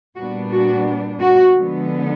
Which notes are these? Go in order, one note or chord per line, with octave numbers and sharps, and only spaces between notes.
A#2 G3 B3 D4 F#4
F#4
F#4
D3 F3 G#3 B3